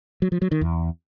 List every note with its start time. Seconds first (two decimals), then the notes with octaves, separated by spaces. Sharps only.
0.22 F#3
0.32 F3
0.42 F#3
0.51 D#3
0.61 E2